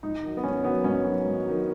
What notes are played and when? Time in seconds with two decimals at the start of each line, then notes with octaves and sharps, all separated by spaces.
0.03 G#2 D#4
0.23 D#3 F#3
0.37 B3
0.44 G#2 C#4
0.64 D#3 F#3 B3
0.84 G#2 C#4
1.04 D#3 F#3
1.25 G#2
1.46 D#3 F#3